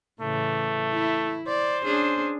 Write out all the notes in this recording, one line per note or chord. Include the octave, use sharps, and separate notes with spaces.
A2 C#3 E3 A3
E4
C5 D5
C#4 D4 G#4